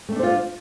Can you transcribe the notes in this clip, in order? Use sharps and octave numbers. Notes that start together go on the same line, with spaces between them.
A3 C#4 D4 F4 C5